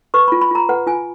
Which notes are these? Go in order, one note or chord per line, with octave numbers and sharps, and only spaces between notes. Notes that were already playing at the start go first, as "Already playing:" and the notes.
B4 C#6
F4 B5
B5
F4 A#5
B4 F#5
F4 G#5